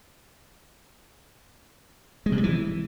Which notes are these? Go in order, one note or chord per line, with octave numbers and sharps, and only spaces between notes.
G#3
C3
G3
E3